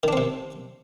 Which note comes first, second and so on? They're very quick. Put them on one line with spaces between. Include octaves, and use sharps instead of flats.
D#3 D4 C4 C3